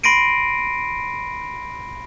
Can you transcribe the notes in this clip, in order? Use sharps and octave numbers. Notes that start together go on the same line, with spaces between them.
B5 C6 A#6 C7 D7 D#7